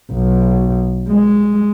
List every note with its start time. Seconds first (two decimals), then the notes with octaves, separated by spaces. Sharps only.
0.12 B1
1.09 G#3